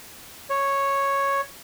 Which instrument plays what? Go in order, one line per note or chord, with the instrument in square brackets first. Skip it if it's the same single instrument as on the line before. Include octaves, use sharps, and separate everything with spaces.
[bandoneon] C#5